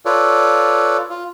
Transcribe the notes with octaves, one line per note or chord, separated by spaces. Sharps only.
F4 A4 B4 C#5 D5
F4